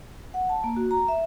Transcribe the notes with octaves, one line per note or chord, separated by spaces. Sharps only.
F#5
A5
A#3
F#4
A#5
E5